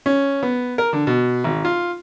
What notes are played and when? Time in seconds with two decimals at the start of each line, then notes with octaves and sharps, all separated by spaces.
0.06 C#4
0.43 B3
0.78 A#4
0.93 D3
1.07 B2
1.44 G#1
1.65 F4